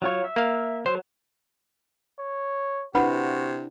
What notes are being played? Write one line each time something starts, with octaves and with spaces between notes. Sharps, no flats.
F#3 F4 C#5
E5
A#3 F5
F#3 C5
C#5
C3 D4 E4 F#4 B4 F#5 B5